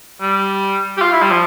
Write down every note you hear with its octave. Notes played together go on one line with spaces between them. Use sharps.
G3
G4
F4
E4
G3
F3